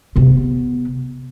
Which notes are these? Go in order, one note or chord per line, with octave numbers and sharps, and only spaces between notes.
C3 B3